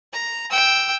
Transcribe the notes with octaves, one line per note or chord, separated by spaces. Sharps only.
A#5
G5 E6